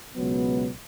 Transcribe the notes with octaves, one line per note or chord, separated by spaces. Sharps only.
C#2 B2 F#3 B3